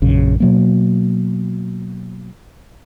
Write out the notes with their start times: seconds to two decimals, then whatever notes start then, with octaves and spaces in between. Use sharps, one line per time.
0.02 A#1 F#2 C#3
0.40 B2 F#3 A#3